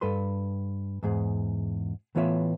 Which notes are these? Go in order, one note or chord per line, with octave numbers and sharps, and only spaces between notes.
G2 A4 B4 C6
E2 G#2 G#4
A2 E3 B3 F4 C#5 E5